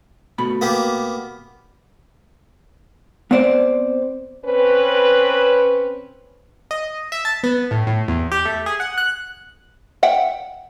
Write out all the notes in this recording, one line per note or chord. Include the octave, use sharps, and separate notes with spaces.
B2 A3 B5
A#3 B3 G4
B3 C4 C5 D5
C4 C#4 B4
D#5
E5
A5
B3
A2
A2
E2
G4
A3
G#4
F#5
F#6
E5 F#5 G5